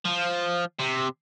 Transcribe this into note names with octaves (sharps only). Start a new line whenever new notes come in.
F3
C3